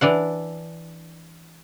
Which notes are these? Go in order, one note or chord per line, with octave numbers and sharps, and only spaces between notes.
E3 D4 F#5